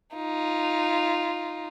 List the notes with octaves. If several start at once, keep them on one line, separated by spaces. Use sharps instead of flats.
D#4 F4